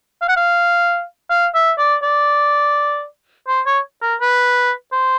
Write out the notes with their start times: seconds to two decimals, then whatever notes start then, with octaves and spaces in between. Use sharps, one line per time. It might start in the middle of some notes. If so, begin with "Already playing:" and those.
0.21 F5
0.29 F#5
0.36 F5
1.30 F5
1.54 E5
1.78 D5
2.03 D5
3.48 C5
3.66 C#5
4.02 A#4
4.21 B4
4.93 C5